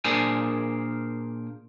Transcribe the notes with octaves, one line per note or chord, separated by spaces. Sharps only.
A#2 D4 G#4 A#4 C5 G#5